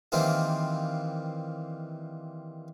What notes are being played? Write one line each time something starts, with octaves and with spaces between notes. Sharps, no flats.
D#3 E3 G3 A#3 C4 F4